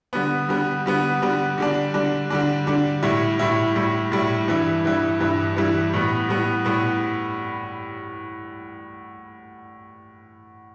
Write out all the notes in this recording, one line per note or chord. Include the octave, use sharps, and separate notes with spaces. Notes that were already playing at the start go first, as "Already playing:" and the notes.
D3 G3 B3
D3 G3 B3
D3 G3 B3
D3 G3 B3
D3 G3 D4
D3 G3 D4
D3 G3 D4
D3 G3 D4
A2 G3 E4
A2 G3 E4
A2 G3 E4
A2 G3 E4
G2 E3 G3 E4
G2 E3 G3 E4
G2 E3 G3 E4
G2 E3 G3 E4
A2 G3 B3
A2 G3 B3
A2 G3 B3